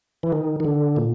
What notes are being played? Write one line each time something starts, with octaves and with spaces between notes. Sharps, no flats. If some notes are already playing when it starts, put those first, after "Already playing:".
E3
D#3
D#3
D3
A#2